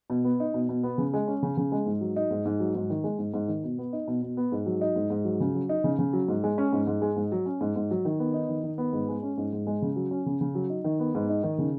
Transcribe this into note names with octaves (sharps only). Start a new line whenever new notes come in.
B2
B3
D#4
B2
B2
B3
C#3
G#3
C#4
C#3
C#3
G#3
G#2
F#3
D#4
G#2
G#2
F#3
G#2
D#3
G#3
G#2
G#2
D#3
B2
B3
D#4
B2
B2
B3
G#2
F#3
D#4
G#2
G#2
F#3
C#3
F#3
D#4
C#3
C#3
F#3
G#2
G#3
C#4
G#2
G#2
G#3
G#2
F#3
C#4
G#2
G#2
F#3
D#3
B3
D#4
D#3
D#3
B3
G#2
G#3
C#4
G#2
G#2
G#3
C#3
F#3
C#4
C#3
C#3
F#3
D#4
D#3
B3
G#2
D#4
D#3
C#3